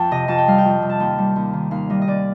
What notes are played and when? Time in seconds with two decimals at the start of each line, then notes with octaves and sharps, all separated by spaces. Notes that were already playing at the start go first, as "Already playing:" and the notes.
Already playing: F2 G5 A5
0.11 C3 D#5
0.28 F2 A5
0.38 G5
0.47 G3 F5
0.58 G5
0.65 F2
0.82 C3
0.89 A5
1.00 D#2 G5
1.18 G3
1.36 D#2
1.53 D#3
1.71 D#2 F5
1.90 G3 D#5
2.02 D#5
2.07 D#2 D5